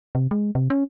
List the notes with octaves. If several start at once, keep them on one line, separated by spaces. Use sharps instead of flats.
C3
G#3
C3
C#4